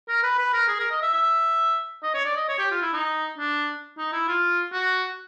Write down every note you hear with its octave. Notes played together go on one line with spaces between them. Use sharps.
A#4
B4
B4
A#4
G#4
A#4
D#5
E5
E5
D#5
C#5
D5
D#5
C#5
G4
F4
E4
D#4
D4
D#4
E4
F4
F#4